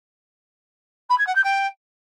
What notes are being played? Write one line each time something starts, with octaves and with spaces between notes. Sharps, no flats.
B5
G#6
F#5
G6
G5